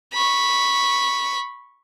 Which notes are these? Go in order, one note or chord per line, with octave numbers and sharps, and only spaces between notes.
B5 C#6